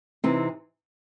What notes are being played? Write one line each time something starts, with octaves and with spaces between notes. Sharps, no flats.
C3 E3 C4 D#4